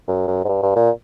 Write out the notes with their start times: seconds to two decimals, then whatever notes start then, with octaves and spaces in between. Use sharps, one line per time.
0.08 F#2
0.28 F#2
0.45 G#2
0.49 G2
0.63 G2
0.76 A#2